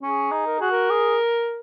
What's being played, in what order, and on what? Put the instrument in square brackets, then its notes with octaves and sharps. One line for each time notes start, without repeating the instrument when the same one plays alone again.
[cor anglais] C#4 [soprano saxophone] G#4
[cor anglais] D#4
[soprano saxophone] A#4
[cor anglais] F#4 [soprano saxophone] G#4
[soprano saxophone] A#4
[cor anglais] G#4